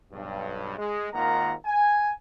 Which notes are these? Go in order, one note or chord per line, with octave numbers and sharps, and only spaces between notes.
B1 G2
G#3
G#1 D#3 A#3 F4 F#5 A#5
G#5